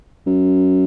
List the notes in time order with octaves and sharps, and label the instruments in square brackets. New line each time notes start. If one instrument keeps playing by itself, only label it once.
[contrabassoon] F#2